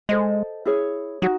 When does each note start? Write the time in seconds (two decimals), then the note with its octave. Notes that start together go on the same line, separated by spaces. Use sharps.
0.09 G#3 A4 C5 D#5
0.65 E4 G#4 C#5
1.22 F#3 D#4 F#4